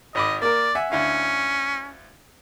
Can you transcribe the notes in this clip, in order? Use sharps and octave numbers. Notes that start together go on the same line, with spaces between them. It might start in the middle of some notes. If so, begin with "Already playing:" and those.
G#1 D#5 B5 D6
A#3 A#4 D5
E5 F#5 G#5
D2 C#4 E4 F5